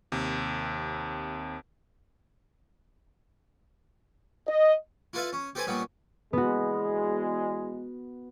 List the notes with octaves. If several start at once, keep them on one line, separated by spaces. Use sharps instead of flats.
D#2 C3
D#5
E4 F4 A4 B4 E5 F5
C#4
G4 A4 B4 C5 G#5 B5
A#2 G3 B3 C#4
E2 G#3 B3 F#4